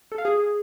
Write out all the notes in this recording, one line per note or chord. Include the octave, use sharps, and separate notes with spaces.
A4
F5
G#4